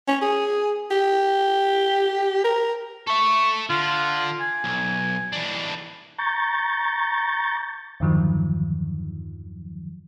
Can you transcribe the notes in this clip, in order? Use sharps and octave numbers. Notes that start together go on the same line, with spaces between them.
C#4
G#4
G4
A#4
A4 E5 C#6
D3 F4
G#5
B1
E3 D4
A#5 C#6 G6 A6
E2 G2 D3 D#3 F3 F#3